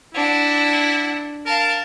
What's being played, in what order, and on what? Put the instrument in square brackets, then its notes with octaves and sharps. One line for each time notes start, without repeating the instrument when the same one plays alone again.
[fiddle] D4 F#5 [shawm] E4
[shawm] A#4 [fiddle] F5 A5